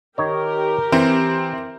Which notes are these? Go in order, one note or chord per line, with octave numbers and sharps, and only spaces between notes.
D#3 D#4 G4 A#4 C#5
E3 C4